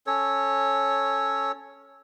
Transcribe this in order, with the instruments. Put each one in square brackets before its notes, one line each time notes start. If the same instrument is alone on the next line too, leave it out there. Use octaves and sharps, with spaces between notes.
[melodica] C#4 A4 C#5